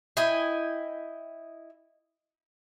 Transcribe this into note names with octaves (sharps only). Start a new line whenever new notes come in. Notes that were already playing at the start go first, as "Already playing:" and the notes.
E4 D#5 G5 G#5